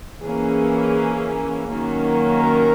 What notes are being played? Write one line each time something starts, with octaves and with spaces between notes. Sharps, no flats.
E3 A#3 C#4 G#4
D#3 F#3 A#3 C#4
A#4